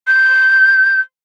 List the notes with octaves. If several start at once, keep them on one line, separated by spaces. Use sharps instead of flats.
G6